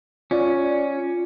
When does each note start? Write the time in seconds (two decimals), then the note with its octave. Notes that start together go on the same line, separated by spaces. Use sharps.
0.31 C#4 F4 D5